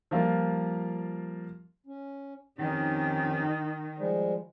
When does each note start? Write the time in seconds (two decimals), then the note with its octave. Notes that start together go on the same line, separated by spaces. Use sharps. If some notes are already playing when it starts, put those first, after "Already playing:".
0.11 F3 G3 A#3 F4
1.86 C#4
2.58 F2 D#3 C#4 D#4 G4
3.97 F3 G3 G#3